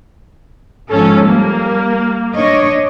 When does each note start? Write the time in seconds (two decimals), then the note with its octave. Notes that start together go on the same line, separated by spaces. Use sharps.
0.91 G#2 F3 C#4 A4
1.25 G3 A#3
2.34 D4 C#5 D#5